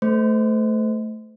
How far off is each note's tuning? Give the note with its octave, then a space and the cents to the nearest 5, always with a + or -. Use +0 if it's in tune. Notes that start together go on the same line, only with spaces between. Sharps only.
A3 +0 C5 -30